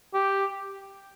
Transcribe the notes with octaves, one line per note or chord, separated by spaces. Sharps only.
G4